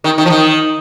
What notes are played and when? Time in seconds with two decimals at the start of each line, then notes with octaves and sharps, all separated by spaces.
0.04 D#3
0.18 D#3
0.25 F3
0.30 D#3